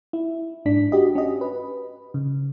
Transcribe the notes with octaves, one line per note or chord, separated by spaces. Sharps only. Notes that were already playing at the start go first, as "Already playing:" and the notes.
E4
G1 G#2 D4 B6
F#4 G4 D#5
C#4 D#5
B4
C#3